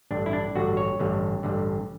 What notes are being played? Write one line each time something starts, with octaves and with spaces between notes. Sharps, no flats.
A1 G2 D3 D4
E4
D4
A1 G2 D3 F#4
C#5
A1 G2 D3
A1 G2 D3